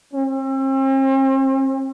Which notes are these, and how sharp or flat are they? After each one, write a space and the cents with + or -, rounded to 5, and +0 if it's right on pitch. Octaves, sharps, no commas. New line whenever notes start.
C4 +45